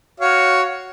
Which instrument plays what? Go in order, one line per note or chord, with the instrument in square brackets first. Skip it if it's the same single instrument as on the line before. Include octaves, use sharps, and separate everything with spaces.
[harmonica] F#4 C#5 F5